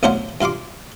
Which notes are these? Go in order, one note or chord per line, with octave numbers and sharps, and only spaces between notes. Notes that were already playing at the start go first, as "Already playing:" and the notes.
B1 A2 D4 C5 F5 F#5
G2 F4 F5 C6 D6